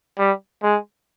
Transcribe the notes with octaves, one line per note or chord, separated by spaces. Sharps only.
G3
G#3